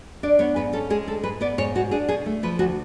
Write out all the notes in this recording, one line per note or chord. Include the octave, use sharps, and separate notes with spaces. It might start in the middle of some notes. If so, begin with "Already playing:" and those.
D4 D5
B3 C#5
G#2 B4
C#4 A4
G#3 G#4
D2 A4
G#2 B4
B3 D5
G#2 C#5
B2 F#4
D4 G#4
B2 G#4
A3
F3 B4
D2 F#4